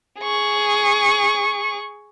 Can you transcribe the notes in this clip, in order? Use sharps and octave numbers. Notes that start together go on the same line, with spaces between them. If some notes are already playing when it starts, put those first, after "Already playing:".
G#4 C#6